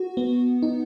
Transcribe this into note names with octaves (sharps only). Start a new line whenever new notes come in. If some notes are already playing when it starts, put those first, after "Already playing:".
Already playing: F#4
B3
D#4